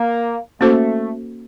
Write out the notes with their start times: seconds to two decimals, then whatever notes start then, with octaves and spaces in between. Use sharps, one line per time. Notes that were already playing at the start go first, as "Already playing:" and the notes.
Already playing: A#3
0.60 A3 A#3 C#4 F#4 A4 C5